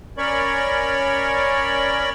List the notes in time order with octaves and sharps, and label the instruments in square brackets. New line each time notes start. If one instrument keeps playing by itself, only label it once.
[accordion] C#4 A#4 C#5 D5 B5 C#6